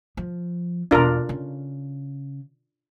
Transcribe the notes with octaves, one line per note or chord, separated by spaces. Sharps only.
F3
E2 B2 D4 F4 A#4
C#3